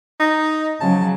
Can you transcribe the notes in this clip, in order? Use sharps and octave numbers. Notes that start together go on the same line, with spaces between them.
D#4
C#3 F3 F#3 A5